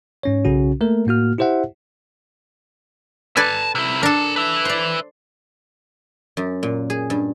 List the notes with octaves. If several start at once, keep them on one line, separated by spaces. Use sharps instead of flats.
G#2 C#4 C#5
B1 C#3 C#4 F#4
A3 A#3 A#4
A2 A#3 F#4 F6
E4 G4 C5 E5 F#5
A4 B4 D5 G#5 A5
C3 E4
D4 A4 A#4 A5
B4 E5
C5 D5
F#2
A#2
G#4
G2